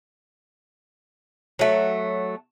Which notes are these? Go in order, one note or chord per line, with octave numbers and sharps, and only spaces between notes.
F#3 A3